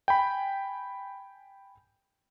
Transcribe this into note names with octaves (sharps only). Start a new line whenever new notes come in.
G5 G#5 B5